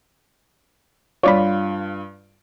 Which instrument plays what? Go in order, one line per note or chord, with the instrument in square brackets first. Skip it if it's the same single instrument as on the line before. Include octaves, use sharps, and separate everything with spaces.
[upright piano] G2 F4 [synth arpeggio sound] C#5 D5 B5